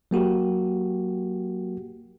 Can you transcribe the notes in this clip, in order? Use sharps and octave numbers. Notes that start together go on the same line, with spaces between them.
F#3 A#3 F#4 G4